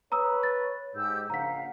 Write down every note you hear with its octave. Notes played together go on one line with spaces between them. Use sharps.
B4 C#5 A#5 D#6 E6
A6
G#2 G4 E6 G6
A#1 C#3 F5 F#5 A#5 B6